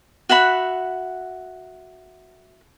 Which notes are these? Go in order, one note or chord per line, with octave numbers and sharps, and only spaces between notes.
F#4 E5 F#5 B5